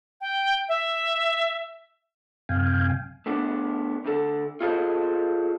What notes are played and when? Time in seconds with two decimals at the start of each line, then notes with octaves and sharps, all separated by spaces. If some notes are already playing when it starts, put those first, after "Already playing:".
0.21 G5
0.68 E5
2.49 F#2 C3 F5 G5 G#5
3.26 A3 B3 D4
4.05 D2 D3 A4
4.60 F4 G#4 A4 B4 C5 D#5